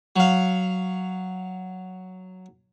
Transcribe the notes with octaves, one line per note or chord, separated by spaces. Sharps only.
F#3 F5